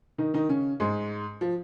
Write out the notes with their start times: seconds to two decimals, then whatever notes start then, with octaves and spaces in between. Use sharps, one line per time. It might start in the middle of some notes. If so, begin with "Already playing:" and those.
0.18 D#3 D#4
0.34 D#3 D#4
0.49 C#3 C#4
0.80 G#2 G#3
1.41 F3